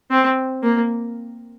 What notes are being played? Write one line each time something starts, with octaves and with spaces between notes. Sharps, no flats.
C4
A#3